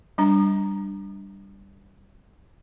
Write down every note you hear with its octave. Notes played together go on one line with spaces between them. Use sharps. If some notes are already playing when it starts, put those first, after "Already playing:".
G3 D4 A#5